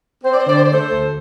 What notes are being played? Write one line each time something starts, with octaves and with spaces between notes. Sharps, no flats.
C4 C5
D5
C5
D3 D5
C5
D5
A3 A4 C5
D2